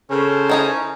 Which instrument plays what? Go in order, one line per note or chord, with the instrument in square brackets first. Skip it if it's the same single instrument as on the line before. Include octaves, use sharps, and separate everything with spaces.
[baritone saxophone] C#3 [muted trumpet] C#4 [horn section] A4 A#4 C5
[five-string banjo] E3 D#4 G#4